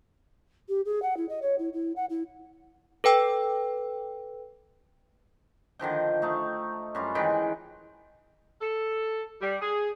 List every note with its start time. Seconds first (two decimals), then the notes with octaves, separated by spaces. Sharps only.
0.69 G4
0.85 G#4
1.02 F#5
1.17 E4
1.29 D#5
1.42 C#5
1.59 E4
1.73 E4
1.96 F#5
2.10 E4
3.04 A4 B4 G5 E6
5.79 D3 D#3 F3 G5
6.22 A3 D#4 C#6
6.95 F#2 G3 F4
7.15 D#3 E3 G#3 G5
8.62 A4
9.42 G3
9.61 G#4